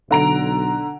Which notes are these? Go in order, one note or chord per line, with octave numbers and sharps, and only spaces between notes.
B1 D3 A#5 D7